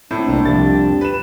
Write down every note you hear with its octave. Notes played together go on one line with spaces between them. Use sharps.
A2 A3 C4 D4
C2 A#3 A#5
C2 F2 G4 A6
B4 E7